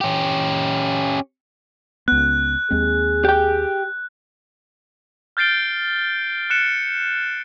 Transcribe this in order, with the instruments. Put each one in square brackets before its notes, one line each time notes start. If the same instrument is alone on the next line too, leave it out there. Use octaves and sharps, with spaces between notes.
[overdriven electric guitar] C#4 G4
[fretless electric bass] C#2 B3 [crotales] F#6
[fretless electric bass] D#2 G#3 C4 [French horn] G#4
[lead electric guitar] G4 G5
[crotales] F6 G6 A6 C7 D7 G7
F#6 C#7 E7